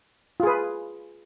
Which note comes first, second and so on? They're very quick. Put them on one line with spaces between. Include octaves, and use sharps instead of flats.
F4 G#4 B4